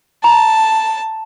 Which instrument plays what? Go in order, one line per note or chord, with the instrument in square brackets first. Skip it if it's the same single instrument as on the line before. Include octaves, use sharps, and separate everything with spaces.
[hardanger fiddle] A5 [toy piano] A#5